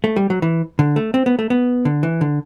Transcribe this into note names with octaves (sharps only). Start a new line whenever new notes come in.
A3
G3
F#3
E3
D3
A3
C4
B3
A3
B3
D3
E3
D3